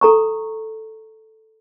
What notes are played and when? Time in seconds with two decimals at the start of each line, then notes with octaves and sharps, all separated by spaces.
0.01 A4 A#5 C#6